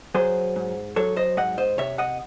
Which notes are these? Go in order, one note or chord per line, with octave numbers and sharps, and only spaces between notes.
F#3 G#4 C5
G#2
F#3 A4 C#5
C5 D#5
G#2 D#5 F#5
C5 D#5
C3 C#5 E5
D#5 F#5